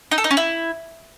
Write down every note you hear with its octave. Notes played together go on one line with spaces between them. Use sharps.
D#4
A4
D#4
C#4
E4